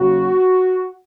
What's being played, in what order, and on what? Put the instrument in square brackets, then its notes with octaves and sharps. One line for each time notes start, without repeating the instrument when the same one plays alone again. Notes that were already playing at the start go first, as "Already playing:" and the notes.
Already playing: [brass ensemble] D#2 C#3 F#3 F#4